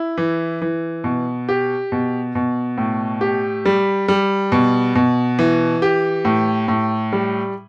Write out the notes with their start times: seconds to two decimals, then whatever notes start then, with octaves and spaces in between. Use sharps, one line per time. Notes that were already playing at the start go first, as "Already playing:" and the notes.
Already playing: E4
0.18 E3
0.62 E3
1.04 B2
1.49 G4
1.92 B2
2.35 B2
2.78 A2
3.21 G4
3.65 G3
4.08 G3
4.52 B2
4.95 B2
5.39 E3
5.82 G4
6.25 A2
6.68 A2
7.12 G3